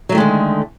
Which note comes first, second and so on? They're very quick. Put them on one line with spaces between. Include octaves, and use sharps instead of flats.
F#3 A3 D#3 G#3 D3